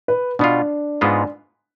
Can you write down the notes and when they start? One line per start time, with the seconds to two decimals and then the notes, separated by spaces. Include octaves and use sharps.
0.08 B4
0.39 B2 B3 D4 F4
1.01 G#2 G#3 B3 F4